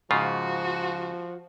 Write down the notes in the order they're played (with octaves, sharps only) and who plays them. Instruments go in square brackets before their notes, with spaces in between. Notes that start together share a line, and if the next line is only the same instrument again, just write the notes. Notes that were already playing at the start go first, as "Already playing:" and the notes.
[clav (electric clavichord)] G#2 C#3 F4 [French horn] F3 [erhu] F#4